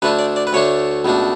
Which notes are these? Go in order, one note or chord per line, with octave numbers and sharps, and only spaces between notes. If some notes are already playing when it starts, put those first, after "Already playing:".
D2 D3 A3 D4 B4
D5
D5
B4
D2 D3 A3 D4 C#5
C#2 B2 A3 D4